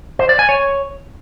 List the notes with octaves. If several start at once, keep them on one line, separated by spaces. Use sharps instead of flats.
C5
D5
G#5
C#5